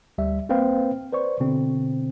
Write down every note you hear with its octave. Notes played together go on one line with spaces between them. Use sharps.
D2 G3 E5
A#3 C4 B4 C5 F5 G5
B4 C5 D5 C#6
B2 D3 C4